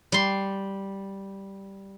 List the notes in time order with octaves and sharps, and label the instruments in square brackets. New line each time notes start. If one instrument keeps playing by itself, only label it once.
[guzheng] G3 C6